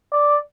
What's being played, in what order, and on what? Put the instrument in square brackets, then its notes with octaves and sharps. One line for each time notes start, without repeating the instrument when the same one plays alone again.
[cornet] D5